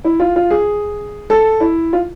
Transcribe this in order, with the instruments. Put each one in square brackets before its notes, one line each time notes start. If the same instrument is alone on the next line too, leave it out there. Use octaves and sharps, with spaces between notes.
[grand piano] E4
F4
F4
G#4
A4
E4
F4